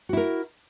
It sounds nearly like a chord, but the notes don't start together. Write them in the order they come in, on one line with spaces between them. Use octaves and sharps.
F#4 E4 A#4